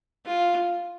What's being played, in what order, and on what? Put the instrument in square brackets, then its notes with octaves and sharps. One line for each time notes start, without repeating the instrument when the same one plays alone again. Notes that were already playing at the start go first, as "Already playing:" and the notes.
[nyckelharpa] F4